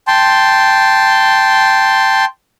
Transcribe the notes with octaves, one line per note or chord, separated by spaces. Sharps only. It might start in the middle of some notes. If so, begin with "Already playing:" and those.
G5 A5 C6